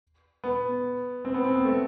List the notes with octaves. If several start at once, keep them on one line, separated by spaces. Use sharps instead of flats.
B3
C4
B3
C4
B3
A3